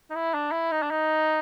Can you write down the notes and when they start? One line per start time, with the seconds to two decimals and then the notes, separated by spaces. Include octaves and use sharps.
0.10 D#4
0.15 E4
0.34 D4
0.52 E4
0.72 D#4
0.82 D4
0.91 D#4